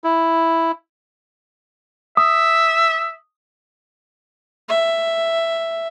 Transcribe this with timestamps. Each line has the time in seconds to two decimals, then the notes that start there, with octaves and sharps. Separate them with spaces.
0.04 E4
2.17 E5 D#6
4.69 E5